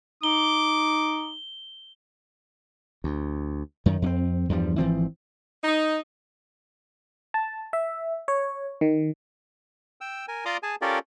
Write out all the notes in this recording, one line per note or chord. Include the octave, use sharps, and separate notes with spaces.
D#4 D6 G7
D2
F#2 D#3
F2 A#3 C4
E2 G2 F3 G3
G#1 E3 F3 C4
D#4
A5
E5
C#5
D#3
G5 E6
A#4 G#5
F4 D5 A#5 C6 D6 D#6
G#4 G#5 A5
C#4 F4 G4 A4 A#4 D5